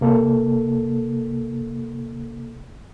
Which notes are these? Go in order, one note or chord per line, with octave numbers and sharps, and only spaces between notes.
C3 A#3 A4